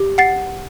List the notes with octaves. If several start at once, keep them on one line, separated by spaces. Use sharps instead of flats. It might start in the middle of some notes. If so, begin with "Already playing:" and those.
Already playing: G4
F#5 A6 C7